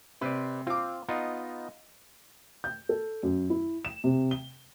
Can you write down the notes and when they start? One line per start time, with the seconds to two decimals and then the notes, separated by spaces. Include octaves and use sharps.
0.21 C3 B4 C5 D5
0.67 C4 F4 D6
1.08 B3 D#4 F4 D#5
2.64 G6
2.89 A4
3.23 F#2
3.50 E4
3.85 E7
4.04 C3
4.31 G7